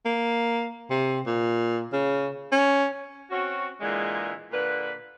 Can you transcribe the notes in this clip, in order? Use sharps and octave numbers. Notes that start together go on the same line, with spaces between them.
A#3
C3
A#2
C#3
C#4
C4 C#4 F#4
A#2 D3 E3 G#3
A#2 D3 B4